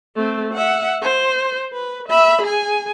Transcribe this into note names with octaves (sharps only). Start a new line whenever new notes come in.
A3 C4
E5 F#5
C5
B4
E5 B5
G#4 G#5